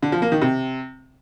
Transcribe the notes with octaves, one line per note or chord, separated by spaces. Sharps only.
D3
F3
A#3
D#3
C3